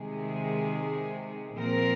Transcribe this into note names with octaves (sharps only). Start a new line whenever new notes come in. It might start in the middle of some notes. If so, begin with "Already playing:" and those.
Already playing: C3 D#3 G#3 G#4
A#2 F3 C4 A#4